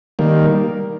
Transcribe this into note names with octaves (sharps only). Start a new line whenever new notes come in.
D#3 G3 A#3